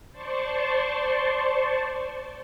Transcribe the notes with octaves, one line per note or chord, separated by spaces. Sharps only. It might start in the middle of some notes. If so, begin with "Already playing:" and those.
C5 D5 A5 C6 C#6